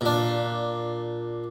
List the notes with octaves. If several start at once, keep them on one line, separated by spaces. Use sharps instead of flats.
A#2 D4